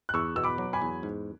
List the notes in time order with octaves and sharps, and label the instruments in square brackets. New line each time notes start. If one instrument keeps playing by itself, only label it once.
[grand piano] F#6
[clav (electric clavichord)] E2 [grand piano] C#6 E6
[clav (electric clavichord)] B2 [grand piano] E6
[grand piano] B5 D6
[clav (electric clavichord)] F#3
[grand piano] G#5 B5
[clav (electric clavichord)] E2
G#2